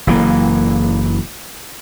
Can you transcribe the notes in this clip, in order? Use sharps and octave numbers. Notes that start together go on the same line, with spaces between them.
F#1 E3 A#3